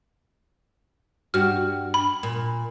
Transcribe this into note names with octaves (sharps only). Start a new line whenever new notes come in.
G2 F#4 G4 F6
B5
A#2